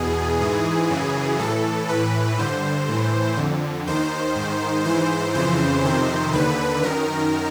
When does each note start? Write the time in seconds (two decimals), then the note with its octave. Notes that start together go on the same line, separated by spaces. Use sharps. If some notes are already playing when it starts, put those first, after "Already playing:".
Already playing: E2 B2 G#4
0.41 G#2 E3
0.90 F#2 C#3 E3
1.39 A2 E3 A4
1.89 A2 E3 B4
2.38 G2 D3 C5
2.88 A2 E3
3.37 F2 D3
3.87 D#2 D#3 C5
4.36 G#2 D#3
4.85 G#2 E3 C5
5.35 F2 C#3 E3 C5
5.83 F2 C3 D#3 C5
6.33 D#2 D3 B4
6.83 F#2 D#3 A#4